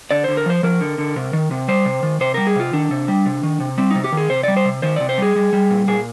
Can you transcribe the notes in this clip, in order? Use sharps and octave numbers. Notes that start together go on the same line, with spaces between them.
D3 D5
D3 C5
A#4
F3 C5
F3 A#4
D3
D3
C3
D#3
C3
G3 C5
C3
D#3
C3 C5
G3 A#4
G#4
C3 F4
D#3 D4
C3
G3
C3
D#3
C3
G3 C4
C3 D#4
G4
D#3
G#4
C3 C5
G3 D5
C5
C3
D#3 C5
C3 D5
C5
G3 G#4
G3
G3
A#2
A#2 G#4